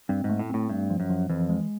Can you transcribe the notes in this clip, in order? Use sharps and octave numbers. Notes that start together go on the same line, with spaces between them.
G2 C4
G#2
A3
A2
A2 C4
G2 A3
F3
F#2
F3
F2 E3
G#3